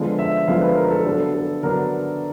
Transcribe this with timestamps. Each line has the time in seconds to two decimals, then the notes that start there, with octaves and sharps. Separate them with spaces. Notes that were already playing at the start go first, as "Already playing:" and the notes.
Already playing: D3 F3 G#3 B3
0.19 E5
0.47 D3 F3 G#3 B3 F5
0.62 B4
0.76 A#4
0.91 A4
1.05 D3 F#3 B3 D4 A4
1.34 A4
1.63 D3 F#3 B3 D4 A#4